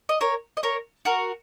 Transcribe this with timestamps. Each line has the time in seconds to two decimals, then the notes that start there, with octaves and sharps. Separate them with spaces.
0.09 D#5
0.21 A#4 C#5
0.57 D#5
0.63 A#4 C#5
1.05 F#4 A#4